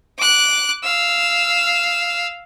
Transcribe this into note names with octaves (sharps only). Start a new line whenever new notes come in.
D6 F#6
F5 E6